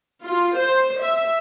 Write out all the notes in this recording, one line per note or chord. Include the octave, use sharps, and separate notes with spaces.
F4
C5
E5